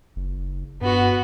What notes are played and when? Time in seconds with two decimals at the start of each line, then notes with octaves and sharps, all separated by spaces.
0.16 F#1
0.81 G2 B3 F#4